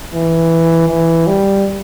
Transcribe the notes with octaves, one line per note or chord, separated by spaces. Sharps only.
E3
E3
G3